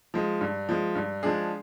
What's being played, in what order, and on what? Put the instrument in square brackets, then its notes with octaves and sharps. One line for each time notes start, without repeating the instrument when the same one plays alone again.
[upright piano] F3 G#3
G2
F3 G#3
G2
F3 G#3 D4 G#4